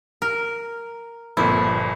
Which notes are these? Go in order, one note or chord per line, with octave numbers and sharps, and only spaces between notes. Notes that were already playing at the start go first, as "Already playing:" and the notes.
A#4
G1 A#2 F3 E4